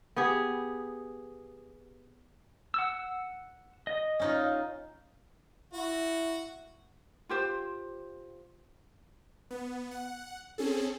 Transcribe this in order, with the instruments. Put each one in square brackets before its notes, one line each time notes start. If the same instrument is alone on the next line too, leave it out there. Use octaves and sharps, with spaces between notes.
[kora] B3 G4 G#4
[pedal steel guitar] F#5 E6
D#5
[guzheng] C#4 D#4 F4
[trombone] E4 [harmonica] F#4
[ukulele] F4 G4 C5
[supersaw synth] B3
F#5
C4 C#4 G#4 A4